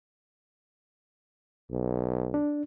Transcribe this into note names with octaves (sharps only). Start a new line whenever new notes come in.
B1
D4